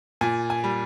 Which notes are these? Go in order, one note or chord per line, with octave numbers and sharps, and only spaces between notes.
A#2 G#5
G#5
G3